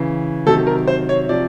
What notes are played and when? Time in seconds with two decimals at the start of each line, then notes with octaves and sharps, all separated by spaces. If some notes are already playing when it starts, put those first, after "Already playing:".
Already playing: C#3 E3
0.46 C3 D#3 F#3 A4
0.67 A#4
0.87 C5
1.09 C#5
1.29 C3 F3 D5